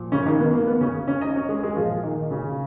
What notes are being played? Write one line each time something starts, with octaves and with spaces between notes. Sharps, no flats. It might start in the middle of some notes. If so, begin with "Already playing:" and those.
Already playing: A#2 F3
C#3 C#4
D#3 D#4
B3
A#3
B3
C#3 C#4
C#4 C#5
D#4 D#5
C#4 C#5
G#3 G#4
G#3 G#4
A#2 F3 F4
D#3 D#4
C#3 C#4